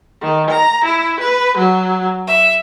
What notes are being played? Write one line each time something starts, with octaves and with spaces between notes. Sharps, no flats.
D#3
A#5
E4
B4
F#3
E5